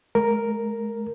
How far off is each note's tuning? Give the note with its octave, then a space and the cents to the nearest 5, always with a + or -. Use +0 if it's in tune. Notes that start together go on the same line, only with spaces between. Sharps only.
G#3 +30 A#4 +0